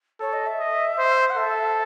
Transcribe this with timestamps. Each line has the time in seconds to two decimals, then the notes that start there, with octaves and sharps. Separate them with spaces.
0.20 A4 C#5
0.33 D#5
0.46 E5
0.59 D#5
0.98 C5
1.30 F#5
1.37 A4 E5